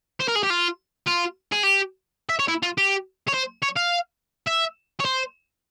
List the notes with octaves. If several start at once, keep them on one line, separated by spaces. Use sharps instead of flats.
C5
A#4
G#4
G4
F4
F4
G#4
G4
E5
C#5
E4
F4
G4
C#5
C5
C#5
F5
E5
C#5
C5